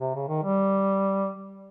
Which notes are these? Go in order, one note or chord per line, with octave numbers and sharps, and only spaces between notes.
C3
C#3
D#3
G3